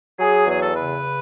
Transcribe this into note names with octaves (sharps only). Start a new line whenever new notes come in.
F#3 G#4
E2 G#4
A4
C#3 B4